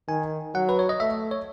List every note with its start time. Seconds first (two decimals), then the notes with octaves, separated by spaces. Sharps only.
0.08 D#3 G#5
0.55 F#3 F#5
0.69 B4
0.79 C#5
0.89 D#5
1.00 A3 E5
1.31 C#5